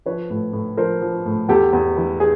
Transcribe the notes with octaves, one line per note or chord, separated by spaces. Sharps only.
F3 B4 C#5
A2
A2
F3 A#4 C5
F3
A2
E2 G4 A4
E2
E3
G#4